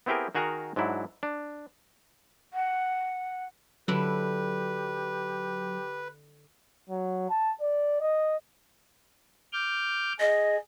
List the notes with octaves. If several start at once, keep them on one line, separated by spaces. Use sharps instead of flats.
B3 C4 E4 G4 G#4 A#4
D#3 F#4 G#4 A#4 F#5 A#5
G#2 F#3 D4 E4
D4
F#5
D3 F#3 D4 E4 G4 B4
F#3
A5
D5
D#5
D6 F6 G6
G#4 D#5